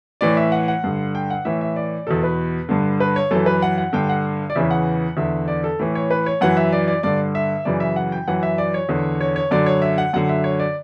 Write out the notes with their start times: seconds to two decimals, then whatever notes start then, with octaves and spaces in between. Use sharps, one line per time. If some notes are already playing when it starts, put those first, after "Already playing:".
0.21 A2 E3 D5
0.37 E5
0.52 F#5
0.68 F#5
0.84 G2 D3
1.15 G5
1.30 F#5
1.45 A2 E3 E5
1.61 E5
1.76 D5
2.07 E2 B2 A4
2.23 B4
2.69 G2 D3
3.00 B4
3.16 C#5
3.31 F#2 E3 A4
3.46 B4
3.62 F#5
3.78 F#5
3.93 G2 D3 G5
4.09 F#5
4.50 D5
4.55 E2 C#3 E3 E5
4.71 F#5
5.17 E2 D3 E5
5.48 D5
5.64 A4
5.79 A2 E3
5.95 C#5
6.11 B4
6.26 C#5
6.41 F#2 E3 F#5
6.57 E5
6.73 D5
6.88 D5
7.03 G2 D3 D5
7.35 E5
7.65 F#2 C#3 E3 D5
7.80 E5
7.96 F#5
8.12 G5
8.28 F#2 E3 F#5
8.43 E5
8.58 D5
8.74 C#5
8.89 E2 D3
9.21 C#5
9.36 C#5
9.51 F#2 D3 D5
9.66 C#5
9.82 E5
9.98 F#5
10.13 F#2 D3 F#5
10.29 E5
10.44 C#5
10.60 D5